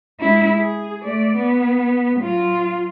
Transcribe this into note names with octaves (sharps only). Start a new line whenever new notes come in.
G#3 E4
G#4
A3 D5
B3
F#3 F4